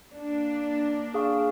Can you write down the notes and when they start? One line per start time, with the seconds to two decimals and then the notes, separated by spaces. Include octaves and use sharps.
0.13 A#3 D4
1.14 G#4 F5 C#6